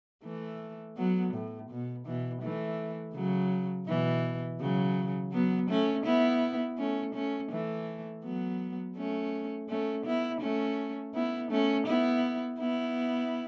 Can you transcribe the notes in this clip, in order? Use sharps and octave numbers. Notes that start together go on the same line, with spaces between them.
E3 A3
F#3 B3
A2
B2
B2 E3
E3 A3
C#3 F#3
B2 E3
C#3 F#3
F#3 B3
A3 C#4
B3 E4
A3 C#4
A3 C#4
E3 A3
F#3 B3
A3 C#4
A3 C#4
B3 E4
A3 C#4
B3 E4
A3 C#4
B3 E4
B3 E4